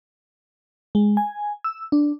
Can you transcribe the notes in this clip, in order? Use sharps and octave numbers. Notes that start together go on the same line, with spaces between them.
G#3
G#5
E6
D4